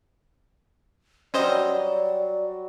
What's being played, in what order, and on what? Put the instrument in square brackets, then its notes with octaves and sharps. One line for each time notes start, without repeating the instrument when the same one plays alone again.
[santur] F#3 G3 [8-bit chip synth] C#4 C5 D#5 [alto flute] D5